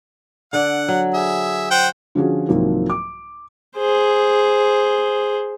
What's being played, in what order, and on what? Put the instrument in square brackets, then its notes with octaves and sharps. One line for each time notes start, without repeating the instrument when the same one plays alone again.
[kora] D3 D5 [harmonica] F#5
[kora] F#3
[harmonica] G#4 E5
C5 F#5 G5
[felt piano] D3 F3 C#4 F4 F#4 G#4
C2 G#2 D#3 F3 F#3 A#3
D6
[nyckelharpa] G#4 C5